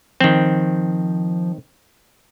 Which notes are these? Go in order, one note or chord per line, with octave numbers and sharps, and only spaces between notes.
D#3 F3 C4